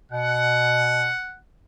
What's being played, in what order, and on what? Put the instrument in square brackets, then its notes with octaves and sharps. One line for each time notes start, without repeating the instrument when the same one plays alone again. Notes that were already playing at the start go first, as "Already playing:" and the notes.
[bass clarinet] B2 [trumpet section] F#5